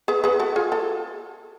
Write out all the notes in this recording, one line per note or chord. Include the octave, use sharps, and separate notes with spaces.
G#4 B4
G#4 B4
F#4 A4
F4 G#4
A4